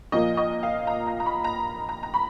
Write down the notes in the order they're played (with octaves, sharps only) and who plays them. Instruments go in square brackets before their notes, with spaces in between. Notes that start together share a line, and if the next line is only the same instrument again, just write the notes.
[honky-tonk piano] A#2 F3 A#3 D#5
D#5
F5
A#5
A#5
A#5
B5
A#5
A#5
A#5
B5